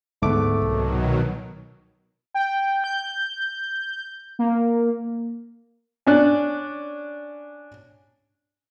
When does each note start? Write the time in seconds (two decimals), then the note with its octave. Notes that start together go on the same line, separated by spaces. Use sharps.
0.22 D1 G#2 D3 A3 B3 D6
0.62 C2 B2 D#3 F#3
2.34 G5
2.84 G6
4.39 A#3
6.07 C#4 D4 F#6